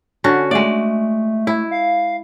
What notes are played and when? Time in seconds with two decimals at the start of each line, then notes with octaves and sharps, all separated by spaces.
0.24 D3 C#4 F#4
0.51 G#3 A3 D5
1.47 E4
1.71 F5